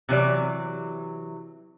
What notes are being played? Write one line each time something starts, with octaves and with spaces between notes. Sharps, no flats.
C3 E3 F#3 D5